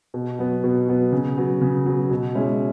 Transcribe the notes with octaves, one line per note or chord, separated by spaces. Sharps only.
B2
F#3 B3
B2
F#3 B3
C#3
F#3 B3
C#3
F#3 B3
B2
G#3 C#4 E4 G#4